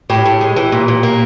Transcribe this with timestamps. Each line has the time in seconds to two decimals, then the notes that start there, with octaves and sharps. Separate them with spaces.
0.10 A2 G4
0.25 A2
0.41 G#3
0.56 E3
0.72 A#2
0.88 A#2
1.03 A#3